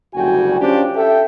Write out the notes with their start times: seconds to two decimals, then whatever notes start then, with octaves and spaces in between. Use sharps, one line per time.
0.15 F#1 D2 G3 F#4 G5 G#5
0.61 C#4 D4 F4 G4 C5 G5
0.95 A4 E5 G5